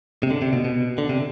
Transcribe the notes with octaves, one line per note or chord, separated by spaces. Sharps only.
C3
D3
C3
B2
B2
D3
C3